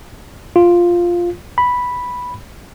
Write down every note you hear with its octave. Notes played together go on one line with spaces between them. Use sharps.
F4
B5